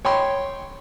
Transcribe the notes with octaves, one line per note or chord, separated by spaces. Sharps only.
C#5 G5 B5 C6